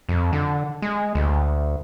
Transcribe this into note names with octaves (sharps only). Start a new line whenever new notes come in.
F2
D3
G#3
D2